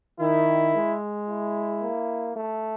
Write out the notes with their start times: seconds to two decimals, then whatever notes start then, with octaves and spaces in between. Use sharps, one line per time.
0.20 D#3 E4
0.74 G#3
1.28 E4
1.83 A#3
2.36 A3